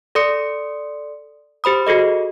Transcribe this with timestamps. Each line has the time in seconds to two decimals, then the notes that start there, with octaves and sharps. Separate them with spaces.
0.15 A4 D5 C6 D#6 C#7
1.64 G4 C5 B5 D#6
1.87 F#4 G#4 A4 D#5